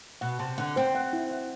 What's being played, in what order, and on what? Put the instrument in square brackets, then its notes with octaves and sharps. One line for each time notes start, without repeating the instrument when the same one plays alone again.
[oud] B2 [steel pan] F#5
[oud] C3 [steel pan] A5
[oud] D3 [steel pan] F#5
[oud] C4 [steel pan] C5
[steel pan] F#5
E4
F#5